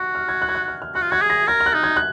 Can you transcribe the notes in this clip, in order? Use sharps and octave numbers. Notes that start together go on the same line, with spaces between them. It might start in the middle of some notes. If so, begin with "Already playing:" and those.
Already playing: F#4 C#6
F6
G#6
F#6
G#6
F#6
F6
F6
F#4 F#6
F4
F#4 G#6
G#4
A#6
A#4 G#6
F6
F#6
D#4
G#6
F#6